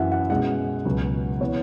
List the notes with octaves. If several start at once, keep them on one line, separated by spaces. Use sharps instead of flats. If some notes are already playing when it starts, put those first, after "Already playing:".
Already playing: F#2 E3 C#4 E5 F#5
F#5
B2 G#3 C#4 F#5
C#2 B2 F#3 C#4
E3 B3 C#5